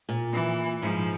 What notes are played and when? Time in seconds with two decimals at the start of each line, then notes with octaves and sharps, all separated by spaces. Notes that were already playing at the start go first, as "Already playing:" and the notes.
0.09 A#2
0.33 E3
0.82 G#2 F3